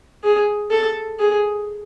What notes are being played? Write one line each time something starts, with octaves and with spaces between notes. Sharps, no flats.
G#4
A4
G#4